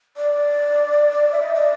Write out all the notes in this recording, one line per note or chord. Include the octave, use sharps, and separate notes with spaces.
D5
E5
D#5
D5